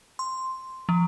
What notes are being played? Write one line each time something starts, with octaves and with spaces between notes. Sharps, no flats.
C6
F3